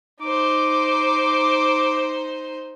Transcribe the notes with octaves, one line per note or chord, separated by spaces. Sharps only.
D#4 C5 D6